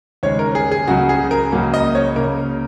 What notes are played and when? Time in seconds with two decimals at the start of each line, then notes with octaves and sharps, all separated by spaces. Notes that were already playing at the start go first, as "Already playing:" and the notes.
0.23 D#2 C#3 G#3 C#5
0.39 A#4
0.55 G#4
0.71 G#4
0.87 C#2 C#3 F#3 F#4
1.09 G#4
1.31 A#4
1.52 C#2 C#3 F#3 A#3
1.74 D#5
1.95 C#5
2.16 C#2 C#3 A#3 A#4